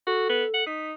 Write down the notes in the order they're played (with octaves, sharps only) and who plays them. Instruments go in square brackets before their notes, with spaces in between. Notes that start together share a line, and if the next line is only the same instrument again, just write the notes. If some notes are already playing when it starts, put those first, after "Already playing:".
[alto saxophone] F#4 [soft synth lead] A4
[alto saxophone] B3
F#5
[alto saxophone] D#4 [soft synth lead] B6